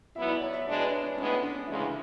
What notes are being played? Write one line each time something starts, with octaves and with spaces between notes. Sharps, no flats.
G#2 F#3 B3 E4 E5
D5
C#5
E5
B2 G#3 D4 D5
B4
C#5
D4
A2 G#3 B3 C#4
D4
D2 C#3 E3 G#3 E4